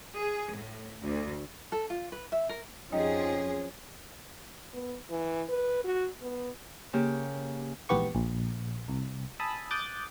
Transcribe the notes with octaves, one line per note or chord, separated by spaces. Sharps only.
G#4
A2
D2
A4
F4
B4
E5
A#4
F2 F3 C#4 D#4 G4 G#4
B3
E3
B4
F#4
B3
C#3 A#3 G4
A#1 E2 G#2 B3 G4 C#6
A#1
C2
G#5 A5 B5 D#6 E6
D6 D#6 F#6 G6 A6